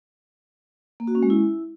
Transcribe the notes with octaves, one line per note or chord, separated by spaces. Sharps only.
A#3
F#4
C#4
G#3
E4